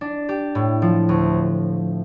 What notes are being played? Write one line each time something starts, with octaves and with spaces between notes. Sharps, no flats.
D4
G4
A2
F3
D2